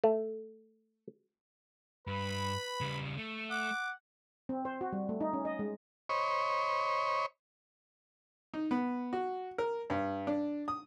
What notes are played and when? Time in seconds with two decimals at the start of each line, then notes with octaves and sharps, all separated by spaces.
0.04 A3
2.07 G2 B4 B5
2.81 C#3 G3
3.17 A3
3.51 F#5 D6
4.49 C4
4.65 C5
4.81 F#4
4.93 G3
5.09 A3
5.21 D#4
5.33 C#4
5.45 D#5
5.59 G#3
6.09 C5 C#5 D#5 B5 C#6
8.54 D#4
8.71 B3
9.13 F#4
9.58 A#4
9.90 G2
10.27 D4
10.68 D#6